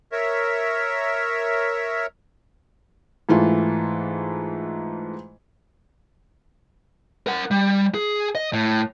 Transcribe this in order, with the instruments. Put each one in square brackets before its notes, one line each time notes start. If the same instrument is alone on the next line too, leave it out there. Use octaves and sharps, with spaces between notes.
[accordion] A#4 C#5 E5
[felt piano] G#2 E3 A3 F4
[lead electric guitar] A#4 F#5
G3
G#4
D#5
A2